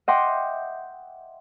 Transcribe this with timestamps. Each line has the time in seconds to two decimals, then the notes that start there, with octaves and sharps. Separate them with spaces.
0.08 D#5 E5 F#5 G5 C6 D6